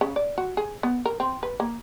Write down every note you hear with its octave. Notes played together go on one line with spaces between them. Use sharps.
C#3
D5
F#4
G#4
B3
A#4
C4
B4
A#3